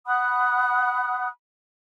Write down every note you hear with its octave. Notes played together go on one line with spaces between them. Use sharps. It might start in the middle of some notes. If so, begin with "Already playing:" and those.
F#5 B5 D#6 F#6